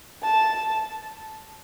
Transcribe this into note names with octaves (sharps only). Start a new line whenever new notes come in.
A5